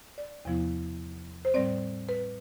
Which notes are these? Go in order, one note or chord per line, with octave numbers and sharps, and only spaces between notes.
D5
E2 C3 F3 B3 E4
C5
A2 G3 C4 D5
B4